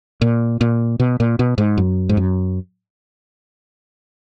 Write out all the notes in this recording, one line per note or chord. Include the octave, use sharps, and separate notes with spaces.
A#2
A#2
B2
A#2
B2
G#2
F#2
G#2
F#2